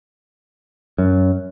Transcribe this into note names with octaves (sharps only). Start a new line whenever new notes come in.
F#2